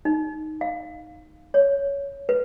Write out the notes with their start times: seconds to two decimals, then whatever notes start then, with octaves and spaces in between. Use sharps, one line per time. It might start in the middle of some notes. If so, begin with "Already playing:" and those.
0.05 D#4
0.61 F5
1.54 C#5
2.29 B4